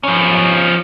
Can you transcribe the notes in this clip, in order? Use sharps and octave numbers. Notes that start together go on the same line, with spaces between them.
F3 C#4